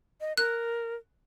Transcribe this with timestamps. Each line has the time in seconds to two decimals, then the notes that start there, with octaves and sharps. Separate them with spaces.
0.21 D#5
0.37 A#4 F#6